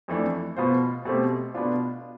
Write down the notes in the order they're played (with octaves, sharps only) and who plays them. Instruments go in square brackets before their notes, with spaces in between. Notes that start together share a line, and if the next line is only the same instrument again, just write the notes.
[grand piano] F2 E3 A3 D4
B2 B3 F4 C5
B2 A3 C4 G4 C5
B2 B3 D4 F4